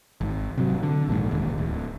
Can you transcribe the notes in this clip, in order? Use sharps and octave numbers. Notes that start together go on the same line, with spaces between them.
G#1
C3 F#3
D3
A#1 D#2 G#2
E1 D#2
D1